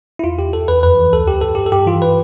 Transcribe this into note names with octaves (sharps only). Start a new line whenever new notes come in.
E4
E2 F4
E2 G4
E2 A4
E2 B4
F2 B4
E3
D2 A4
D2 G4
G2 A4
G2 G4
A4
G2 G4
E3 F4
B4